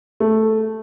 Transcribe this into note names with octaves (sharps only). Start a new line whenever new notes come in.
A3